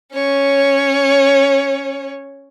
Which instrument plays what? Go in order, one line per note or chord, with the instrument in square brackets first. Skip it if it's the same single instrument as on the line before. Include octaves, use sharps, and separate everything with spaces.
[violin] C#4 C#5